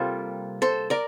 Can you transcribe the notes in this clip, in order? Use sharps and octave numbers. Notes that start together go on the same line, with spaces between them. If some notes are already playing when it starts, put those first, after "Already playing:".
Already playing: C3 G3 A#3 F4 A4 C5
A4 C5
A#4 D5